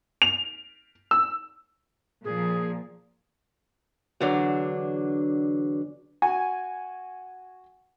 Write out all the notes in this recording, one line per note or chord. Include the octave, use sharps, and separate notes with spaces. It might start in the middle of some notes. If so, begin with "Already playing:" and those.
F7
E6
A#2 F3 G#4
E2 D3 F#3 D4
F#4 G#5